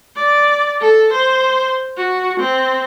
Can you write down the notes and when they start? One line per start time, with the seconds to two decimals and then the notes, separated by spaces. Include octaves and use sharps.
0.16 D5
0.80 A4
1.13 C5
1.97 F#4
2.40 C4